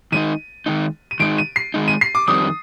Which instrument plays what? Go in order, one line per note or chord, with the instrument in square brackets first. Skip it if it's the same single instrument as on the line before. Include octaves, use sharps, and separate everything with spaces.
[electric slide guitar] D#3 G#3 D#4 [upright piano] D#7
[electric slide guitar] D#3 G#3 D#4
[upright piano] D#7
[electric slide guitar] D#3 G#3 D#4 [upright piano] D7
[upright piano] D#7
C7
[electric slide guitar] D#3 G#3 D#4
[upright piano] D#7
C7
D6
[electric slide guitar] F2 D#3 G3 C4 [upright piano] D#6